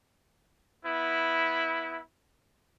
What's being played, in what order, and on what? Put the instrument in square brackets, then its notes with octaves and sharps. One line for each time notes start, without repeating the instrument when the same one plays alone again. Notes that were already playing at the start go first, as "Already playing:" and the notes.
[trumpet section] B3 E4